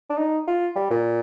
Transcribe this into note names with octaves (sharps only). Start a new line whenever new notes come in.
D4
D#4
F4
G3
A#2